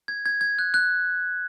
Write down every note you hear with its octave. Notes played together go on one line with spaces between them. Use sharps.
G#6
G#6
G#6
F#6
F#6